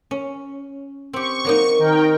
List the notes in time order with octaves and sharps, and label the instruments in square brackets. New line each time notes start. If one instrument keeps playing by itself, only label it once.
[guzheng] C#4
[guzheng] C4 G4 [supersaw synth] C#6
[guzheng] F#3 A#3 D#4
[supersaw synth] D#3 A#4 G5